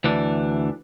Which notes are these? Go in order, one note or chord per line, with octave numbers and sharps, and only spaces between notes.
D2 E3 D4